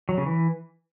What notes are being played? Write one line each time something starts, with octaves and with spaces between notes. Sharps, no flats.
F#3
C#3
E3